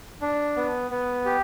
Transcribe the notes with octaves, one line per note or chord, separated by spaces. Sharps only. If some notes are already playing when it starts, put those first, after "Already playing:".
D4
B3
B3
G4